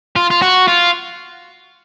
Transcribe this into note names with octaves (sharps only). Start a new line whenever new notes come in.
F4
F4
F#4
F4